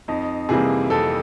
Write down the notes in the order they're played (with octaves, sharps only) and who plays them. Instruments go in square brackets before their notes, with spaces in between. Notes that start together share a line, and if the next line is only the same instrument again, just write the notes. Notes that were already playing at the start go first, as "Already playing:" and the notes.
[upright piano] F2 D#4
C3 E3 G3 A#3 G#4
F2 A4